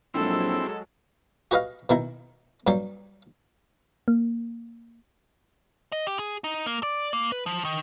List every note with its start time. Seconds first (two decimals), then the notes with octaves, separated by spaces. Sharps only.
0.14 A#1 F#3 G#3 C4 E4 A4
1.51 F#4 G4 B4 D#5 F5
1.89 B2 D#3 E4
2.67 G2 F#3 G4 C6
4.08 A#3
5.92 D#5
6.07 G4
6.19 G#4
6.44 D#4
6.66 A#3
6.83 D5
7.13 A#3
7.32 B4
7.46 F3
7.65 D#3